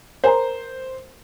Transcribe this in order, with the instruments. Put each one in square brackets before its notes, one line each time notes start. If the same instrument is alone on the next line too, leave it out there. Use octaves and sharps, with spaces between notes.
[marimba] A#4 G#5 A#5 [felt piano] C5